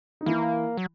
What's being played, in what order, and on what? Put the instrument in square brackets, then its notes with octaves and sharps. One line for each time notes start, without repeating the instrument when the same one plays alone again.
[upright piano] D#4
[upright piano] E3 E4 [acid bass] A#3
[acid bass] F#3